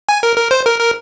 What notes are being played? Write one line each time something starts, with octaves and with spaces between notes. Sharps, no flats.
G#5
A#4
A#4
C5
A#4
A#4